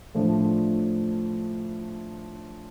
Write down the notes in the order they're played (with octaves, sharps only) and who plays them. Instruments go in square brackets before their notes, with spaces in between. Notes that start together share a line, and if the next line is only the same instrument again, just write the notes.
[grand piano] A2 F3 A3 D4